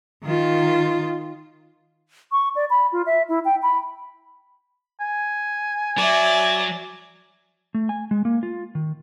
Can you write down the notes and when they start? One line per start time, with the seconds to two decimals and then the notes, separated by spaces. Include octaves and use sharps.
0.24 D#3 F4
2.32 C#6
2.56 D5
2.70 B5
2.92 F4
3.06 E5
3.29 E4
3.45 G5
3.63 B5
5.00 G#5
5.98 F#3 D5 E5
7.74 A3
7.89 G#5
8.11 G#3
8.25 A#3
8.43 F4
8.75 D#3